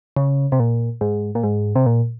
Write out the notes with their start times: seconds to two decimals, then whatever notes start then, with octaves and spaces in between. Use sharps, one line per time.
0.16 C#3
0.52 C3
0.60 A#2
1.01 G#2
1.35 A#2
1.43 G#2
1.76 C3
1.86 A#2